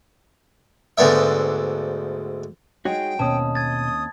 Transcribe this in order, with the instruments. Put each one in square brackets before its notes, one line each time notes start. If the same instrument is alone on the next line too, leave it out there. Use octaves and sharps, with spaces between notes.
[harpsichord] D2 G#2 B3 D4 E5
[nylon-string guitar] G#3 D#4 G#4 [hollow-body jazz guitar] F#4 C#5 [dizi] G5
[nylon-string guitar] D#2 C4 C#4 [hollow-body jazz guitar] B2 [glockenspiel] A5 D#6
[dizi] D#6 [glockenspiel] G#6 A6